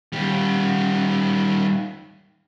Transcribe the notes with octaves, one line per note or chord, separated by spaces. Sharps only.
D#3 G3